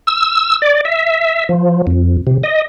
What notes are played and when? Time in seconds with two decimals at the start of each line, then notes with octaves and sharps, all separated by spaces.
0.07 E6
0.62 D5
0.85 E5
1.49 F3
1.87 F2
2.27 C3
2.43 D#5